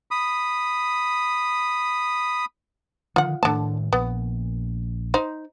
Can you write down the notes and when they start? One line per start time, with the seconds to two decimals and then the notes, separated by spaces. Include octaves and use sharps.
0.11 B5 D#6
3.16 D3 D#3 F3 F4 F#5
3.43 A2 D3 D#3 A3 A5
3.93 A#1 B3
5.14 D#4 C5